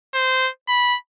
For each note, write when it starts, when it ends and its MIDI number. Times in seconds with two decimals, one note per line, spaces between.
0.14 0.50 72
0.69 0.97 83